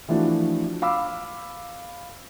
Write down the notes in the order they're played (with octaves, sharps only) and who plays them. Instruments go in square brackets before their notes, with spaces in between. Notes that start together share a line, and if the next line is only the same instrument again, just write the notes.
[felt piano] E3 F3 A3 D4 E4 F#4
F5 B5 D6 E6